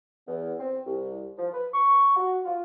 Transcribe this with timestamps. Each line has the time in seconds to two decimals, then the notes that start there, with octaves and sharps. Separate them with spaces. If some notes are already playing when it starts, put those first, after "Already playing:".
0.27 E2
0.60 C4
0.86 C2
1.38 F3
1.53 B4
1.74 C#6
2.15 F#4
2.45 F4